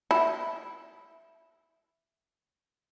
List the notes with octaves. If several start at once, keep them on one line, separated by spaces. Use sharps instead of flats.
E4